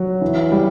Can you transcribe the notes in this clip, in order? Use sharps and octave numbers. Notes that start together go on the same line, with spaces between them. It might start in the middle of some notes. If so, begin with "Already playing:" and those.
Already playing: F#3
E3
G3